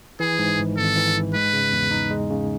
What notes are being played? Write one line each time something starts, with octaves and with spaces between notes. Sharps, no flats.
E3 G#4
G#2
G#1
G#1 A4
E3
G#2
G#3 B4
C#3
E2
D#4
G#3
C#3